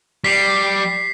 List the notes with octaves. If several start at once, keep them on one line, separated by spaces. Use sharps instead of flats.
G3 B6 C7